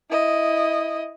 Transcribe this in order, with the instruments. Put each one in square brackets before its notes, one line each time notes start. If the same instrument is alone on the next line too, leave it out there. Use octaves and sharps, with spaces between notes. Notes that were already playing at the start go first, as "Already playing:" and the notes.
[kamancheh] E4 D#5